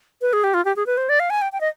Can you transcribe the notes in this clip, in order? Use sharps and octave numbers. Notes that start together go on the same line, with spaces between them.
B4
G#4
G4
F4
G4
G#4
B4
C5
D5
F5
G#5
G5
G5
D#5